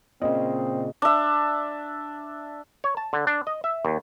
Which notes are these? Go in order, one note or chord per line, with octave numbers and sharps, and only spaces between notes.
A#2 C#3 C4 D#5
D4 E5
C#5
A5
D3
D4
D#5
E5
D#2